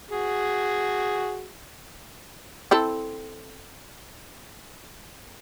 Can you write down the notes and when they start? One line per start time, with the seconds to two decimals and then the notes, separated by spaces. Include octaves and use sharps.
0.10 F#4 G#4
2.71 C4 E4 A4